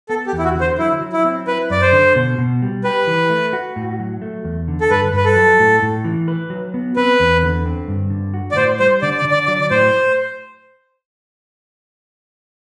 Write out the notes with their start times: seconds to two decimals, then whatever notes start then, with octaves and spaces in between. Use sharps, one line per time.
0.09 B3 A4
0.27 G4
0.33 E2
0.38 E4
0.44 F#4
0.55 D3
0.61 C5
0.78 F#3 E4
1.01 F#3
1.13 E4
1.25 C4
1.47 E4 B4
1.70 F#2 D5
1.82 C5
1.93 D3
2.15 B2
2.38 B2
2.62 G3
2.84 G4 B4
3.07 E3
3.30 A3
3.53 F#4
3.76 A2
3.99 F#3
4.22 A3
4.44 E2
4.68 D3
4.81 A4
4.90 G2 B4
5.13 G2 B4
5.25 A4
5.36 F#3
5.59 A2
5.83 A2
6.04 E3
6.28 B4
6.50 F#3
6.74 B3
6.96 C4 B4
7.20 E2
7.43 D3
7.66 C4
7.88 G2
8.10 D3
8.34 F#4
8.52 D5
8.56 A2 C5
8.80 G3 C5
9.02 D3 D5
9.17 D5
9.25 D3
9.31 D5
9.46 F#3 D5
9.61 D5
9.71 A2 C5